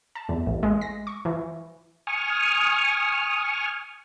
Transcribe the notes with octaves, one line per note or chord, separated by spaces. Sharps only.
A5
E2
A1
G#3
A#6
C#6
E3
G#5 C#6 D#6 F6